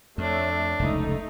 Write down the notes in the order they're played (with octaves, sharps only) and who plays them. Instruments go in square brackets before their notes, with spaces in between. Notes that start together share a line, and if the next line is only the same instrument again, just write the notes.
[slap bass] F2 [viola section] A3 C#5 E5 [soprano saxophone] D4
[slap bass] F1 C#2 [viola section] A3 D#4